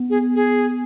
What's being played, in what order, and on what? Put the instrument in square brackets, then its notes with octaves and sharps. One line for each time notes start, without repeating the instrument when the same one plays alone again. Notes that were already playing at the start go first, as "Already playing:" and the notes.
Already playing: [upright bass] B3
[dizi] G#4
G#4